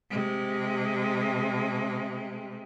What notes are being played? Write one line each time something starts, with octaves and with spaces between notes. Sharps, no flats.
C3 G#3